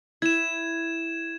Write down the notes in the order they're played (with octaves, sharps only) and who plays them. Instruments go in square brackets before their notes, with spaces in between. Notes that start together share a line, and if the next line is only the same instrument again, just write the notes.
[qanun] E4 [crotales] G#6 E7